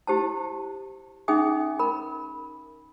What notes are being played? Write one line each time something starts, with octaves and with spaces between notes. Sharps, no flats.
E4 G4 C5 A5
C#4 D#4 G#4 E5 G#5 D#6
A#4 B5